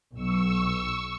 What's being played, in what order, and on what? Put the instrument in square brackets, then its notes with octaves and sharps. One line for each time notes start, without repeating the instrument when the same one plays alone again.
[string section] B1 [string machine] C#6 E6